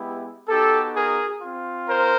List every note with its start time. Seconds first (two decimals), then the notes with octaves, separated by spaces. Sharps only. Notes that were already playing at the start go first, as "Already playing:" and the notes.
Already playing: G#3 B3 E4 G4
0.48 B3 D#4 F#4 G4 A4
0.95 G#4 A#4
1.41 C4 F4
1.88 A#4 C5